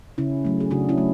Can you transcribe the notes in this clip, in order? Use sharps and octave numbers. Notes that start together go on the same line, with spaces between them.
C#3 C#4 E4
F#3 A3
G#4
C#3 D4 F#4
C#4 E4
F#3 A3